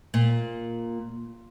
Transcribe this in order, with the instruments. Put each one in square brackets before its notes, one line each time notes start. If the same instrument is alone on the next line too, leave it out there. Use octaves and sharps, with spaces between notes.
[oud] A#2